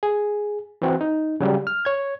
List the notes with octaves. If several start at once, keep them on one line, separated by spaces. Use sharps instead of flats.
G#4
E3 C4 F#4
D#4
C#3 F#3 G3
F6
C#5 G#6